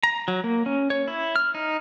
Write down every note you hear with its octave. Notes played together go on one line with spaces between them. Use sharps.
A#5
F#3
A#3
C#4
C#5
E4
F6
D#4